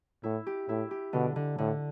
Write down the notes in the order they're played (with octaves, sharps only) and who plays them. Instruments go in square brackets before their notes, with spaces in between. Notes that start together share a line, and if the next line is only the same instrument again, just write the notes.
[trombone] A2 [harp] E4
[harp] G4
[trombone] A2 [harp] E4
[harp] G4
[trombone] B2 [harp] D3
[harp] D3
[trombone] A2 [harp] D3